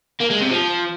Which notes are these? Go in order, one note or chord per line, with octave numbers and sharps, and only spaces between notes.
A#3
G#3
C3
F3